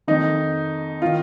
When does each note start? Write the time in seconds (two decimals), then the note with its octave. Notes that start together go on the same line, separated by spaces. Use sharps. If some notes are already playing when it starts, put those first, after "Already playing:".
0.07 F2 D#3 D#4
1.02 D#3 F4